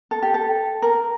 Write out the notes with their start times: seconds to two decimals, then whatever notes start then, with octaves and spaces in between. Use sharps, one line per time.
0.11 A4
0.22 G4
0.34 A4
0.82 A#4